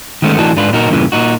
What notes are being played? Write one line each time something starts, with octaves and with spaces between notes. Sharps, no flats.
D#3 G#3 A3 B3 C#4
A2 E3 D4 D#4 F#4 A5
G#2 D3 D4 F4 B4
A#2 F#3 D#4 F#4 A#4
E2 G2 A#2 C#3 E3
A#2 D#4 F#4